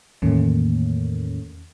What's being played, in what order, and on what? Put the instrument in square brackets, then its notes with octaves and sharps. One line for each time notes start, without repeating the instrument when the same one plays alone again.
[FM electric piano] E2 A2 D#3 A3 A#3 C#4